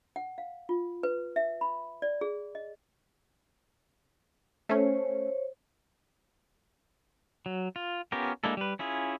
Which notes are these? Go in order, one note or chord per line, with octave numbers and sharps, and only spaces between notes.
F#5
F5
F4
B4
E5
B5
D5
G#4
D#5
A3 C#4 C5 C#5
F#3
F4
B3 C#4 F4 G4 A#4
G#3 A#3 D4 E4 A4
G3 B4
C#4 E4 F4 G#4